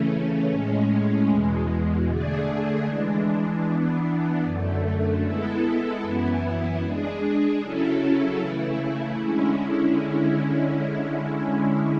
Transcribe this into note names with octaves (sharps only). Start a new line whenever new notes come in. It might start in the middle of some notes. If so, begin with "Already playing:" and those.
Already playing: C#3 E3 A3 C#4
A2 G#3 C#4
E2 B2 G#3
D3 A3 D4 G#4
E3 G#3 D4
E3 B3 D4
F#2 D3 A3
G#3 B3 E4 A4
F#2 E3 B3 E4
G#3 D4 G#4
C#3 F#3 C#4 E4 A4
C#3 E3 A3 E4
D3 G#3 C#4 E4